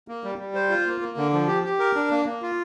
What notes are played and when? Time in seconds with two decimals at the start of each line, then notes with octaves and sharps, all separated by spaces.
0.08 A#3
0.24 G3
0.38 G3
0.55 C5
0.70 F4
0.86 A#3
1.01 A#3
1.17 D3
1.33 F3
1.48 G4
1.63 G4
1.79 A#4
1.95 D4
2.10 A#3
2.26 A#3
2.42 F4